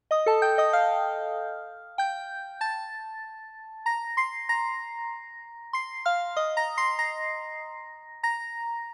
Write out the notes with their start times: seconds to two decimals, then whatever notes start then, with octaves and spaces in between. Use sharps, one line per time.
0.11 D#5 D#6
0.26 A4 A5
0.42 G5 G6
0.58 D#5 D#6
0.73 F5 F6
1.98 G5 G6
2.61 A5 A6
3.86 A#5 A#6
4.17 C6 C7
4.49 A#5 A#6
5.73 C6 C7
6.05 F5 F6
6.36 D#5 D#6
6.57 A#5 A#6
6.78 C6 C7
6.99 A#5 A#6
8.23 A#5 A#6